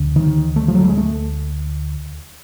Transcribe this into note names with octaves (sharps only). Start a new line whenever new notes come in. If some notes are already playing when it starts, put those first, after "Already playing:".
Already playing: D2 D3
D#3
A3
F3
F#3
G3
G#3
A3